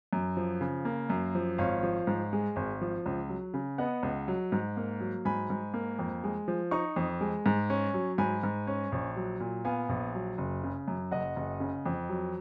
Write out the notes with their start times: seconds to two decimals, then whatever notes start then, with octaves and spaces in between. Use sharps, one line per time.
0.13 F#2
0.37 F3
0.61 C#3
0.85 A#3
1.10 F#2
1.35 F3
1.58 G#1 C#5 F5
1.83 F3
2.07 G#2
2.33 G#3
2.56 G#1
2.81 F3
3.06 C#2
3.29 F#3
3.54 C#3
3.78 B3 D#5 F#5
4.03 C#2
4.28 F#3
4.52 G#2
4.77 A#3
5.00 F#3
5.25 G#2 G#5 B5
5.50 G#2
5.74 A#3
5.99 F2
6.24 G#3
6.48 F3
6.71 D#4 A#5 C#6
6.96 F2
7.21 G#3
7.46 G#2
7.70 C#4
7.94 F#3
8.18 G#2 G#5 B5
8.43 G#2
8.67 C#4
8.92 A#1
9.16 F#3
9.40 A#2
9.65 B3 F5 G#5
9.89 A#1
10.15 F#3
10.38 F#1
10.63 C#3
10.88 F#2
11.11 F#1 D#5 F#5
11.36 F#1
11.60 C#3
11.86 F2
12.09 F#3